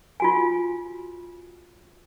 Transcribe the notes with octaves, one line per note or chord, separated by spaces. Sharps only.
F4 F#4 G#5